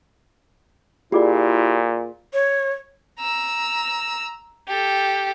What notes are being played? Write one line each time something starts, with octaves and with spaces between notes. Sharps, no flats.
A#2 E4 F4 G4 G#4 D5
C#5
A#5 E6
G4 A4